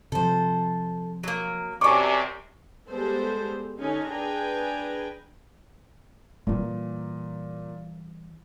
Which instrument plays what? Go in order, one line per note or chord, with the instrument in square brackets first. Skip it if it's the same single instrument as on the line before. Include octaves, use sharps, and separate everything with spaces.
[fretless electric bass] C3 F3 [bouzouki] A4 C5
[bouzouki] F#3 A#3
[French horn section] F#2 C3 [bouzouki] G3 D4 [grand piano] G#5 C#6 D6
[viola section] G3 G#3 B3 G4 A4 C5
D3 C#4 D#4 G#5
D4 G#4 B4 G5 G#5 A#5
[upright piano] A#2 [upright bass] E3 G3